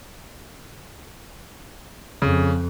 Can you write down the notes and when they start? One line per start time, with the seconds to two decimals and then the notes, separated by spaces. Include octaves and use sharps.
2.22 F2 C#3